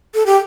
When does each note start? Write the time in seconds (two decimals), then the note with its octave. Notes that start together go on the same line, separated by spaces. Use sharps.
0.15 A4
0.26 G4